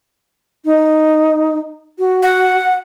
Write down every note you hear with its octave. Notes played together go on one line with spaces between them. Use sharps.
D#4
F#4
F#5